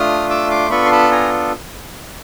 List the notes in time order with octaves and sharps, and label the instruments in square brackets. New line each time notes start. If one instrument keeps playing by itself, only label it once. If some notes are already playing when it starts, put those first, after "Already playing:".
Already playing: [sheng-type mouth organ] A3 D4 F4 D#6 F6
D6 E6
C6 D6
B3 D4 F4 A4 B5 C#6
C6
A5 B5
G#5 A#5